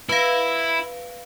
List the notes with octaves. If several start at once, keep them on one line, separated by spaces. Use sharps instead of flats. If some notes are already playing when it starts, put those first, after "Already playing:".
E4 B4 F5